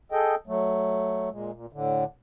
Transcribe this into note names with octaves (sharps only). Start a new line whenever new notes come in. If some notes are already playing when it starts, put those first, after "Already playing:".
G#4 A4 D#5 G5
F#3 A3
A#2 G#3
A#2
A2 D3